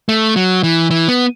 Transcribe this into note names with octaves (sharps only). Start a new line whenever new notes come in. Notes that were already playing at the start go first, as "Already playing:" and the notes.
A3
F#3
E3
E3
B3